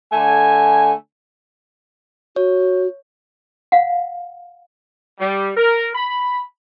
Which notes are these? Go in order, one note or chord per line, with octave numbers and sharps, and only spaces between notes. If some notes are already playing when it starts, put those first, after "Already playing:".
D3 A3 G#5
F#4 C#5
F5 F#5
G3
A#4
B5